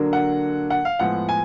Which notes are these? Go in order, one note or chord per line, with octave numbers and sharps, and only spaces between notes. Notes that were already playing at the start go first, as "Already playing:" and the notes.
Already playing: D3 F#3 A#3 D4
F#5
F#5
F5
A2 F3 G#3 B3 F#5
G#5